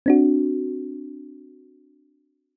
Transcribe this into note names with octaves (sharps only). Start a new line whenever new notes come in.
C4 D4 F#4